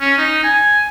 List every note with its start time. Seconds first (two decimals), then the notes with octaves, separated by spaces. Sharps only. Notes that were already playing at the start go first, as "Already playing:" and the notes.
0.01 C#4
0.18 D#4
0.44 G#5